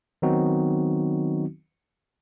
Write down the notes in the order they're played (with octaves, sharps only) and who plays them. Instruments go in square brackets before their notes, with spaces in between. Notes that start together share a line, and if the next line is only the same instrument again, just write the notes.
[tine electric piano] D#3 F#3 B3 C4 D#4 F#4